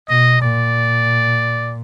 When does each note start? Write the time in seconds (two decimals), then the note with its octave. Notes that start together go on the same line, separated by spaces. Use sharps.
0.09 B2 D#5
0.42 A#2 D5